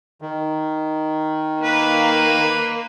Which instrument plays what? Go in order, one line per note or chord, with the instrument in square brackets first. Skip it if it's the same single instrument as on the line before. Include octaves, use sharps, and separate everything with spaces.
[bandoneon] D#3
[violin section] A#3 [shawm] B4